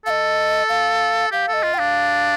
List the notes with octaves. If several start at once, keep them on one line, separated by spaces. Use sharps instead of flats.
A4 D#5 F5
F5
G4 F5
A4
D#5
F4
G5
D4 F5